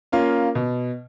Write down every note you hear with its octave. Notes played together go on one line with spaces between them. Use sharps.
A#3 C#4 F4
B2